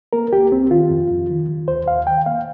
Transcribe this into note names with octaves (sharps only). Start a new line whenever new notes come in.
A#3 A#4
C2 G4
C2 C4
D#3 F4
F2
F2
D#3
D#3
D#2 C5
D#2 F5
D#3 G5
A#3 F5